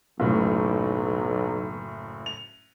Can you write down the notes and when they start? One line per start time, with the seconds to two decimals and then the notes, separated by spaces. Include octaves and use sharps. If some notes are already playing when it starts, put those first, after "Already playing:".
0.20 F#1 B1 A2 F#3
2.26 F7